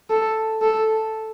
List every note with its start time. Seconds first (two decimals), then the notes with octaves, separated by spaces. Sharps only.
0.10 A4
0.62 A4